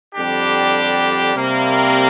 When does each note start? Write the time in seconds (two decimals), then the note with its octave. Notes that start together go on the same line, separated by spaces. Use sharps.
0.14 F2 D3 G3 D4 G4
1.35 C3 G3 A#3